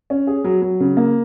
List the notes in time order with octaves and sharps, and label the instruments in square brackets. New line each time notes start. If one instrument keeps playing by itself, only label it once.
[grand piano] C#4
G#4
F#3
F#3
C#3
A#3